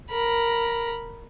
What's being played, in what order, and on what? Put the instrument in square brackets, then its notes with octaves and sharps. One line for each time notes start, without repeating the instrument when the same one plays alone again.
[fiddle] A#4 B5